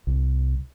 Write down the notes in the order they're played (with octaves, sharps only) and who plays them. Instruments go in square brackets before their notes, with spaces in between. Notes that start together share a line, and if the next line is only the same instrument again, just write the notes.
[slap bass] C2